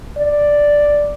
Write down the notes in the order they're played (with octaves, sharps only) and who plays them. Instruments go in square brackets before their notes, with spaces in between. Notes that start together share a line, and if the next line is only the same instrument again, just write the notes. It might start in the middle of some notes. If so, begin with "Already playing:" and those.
[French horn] D5